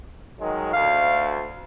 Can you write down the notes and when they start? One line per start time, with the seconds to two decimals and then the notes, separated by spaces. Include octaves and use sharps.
0.40 D#3 F#3 G#3
0.73 D2 F5